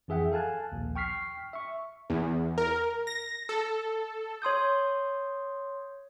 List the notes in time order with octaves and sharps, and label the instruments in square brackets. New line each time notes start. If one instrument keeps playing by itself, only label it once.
[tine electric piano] F2 E3 G#4 E5 F#5 G5
A4 F5 G#5 A5 F#6
A#1 D#2
G5 C#6 F6 B6 C7
E5 C#6
[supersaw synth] E2
A#4
A#6
A4
[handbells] C#5 C6 D#6 G6